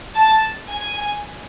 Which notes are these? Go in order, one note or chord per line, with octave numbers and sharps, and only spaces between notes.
A5
G#5